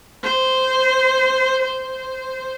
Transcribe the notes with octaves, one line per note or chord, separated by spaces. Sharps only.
C5
C5